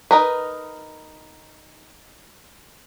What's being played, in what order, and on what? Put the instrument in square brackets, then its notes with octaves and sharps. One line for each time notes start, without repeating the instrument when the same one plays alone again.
[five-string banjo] D#4 A#4 B4